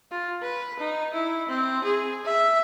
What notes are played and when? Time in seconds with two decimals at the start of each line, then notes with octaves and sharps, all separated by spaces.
0.12 F4
0.42 B4
0.79 D#4
1.14 E4
1.49 C4
1.84 G#4
2.25 E5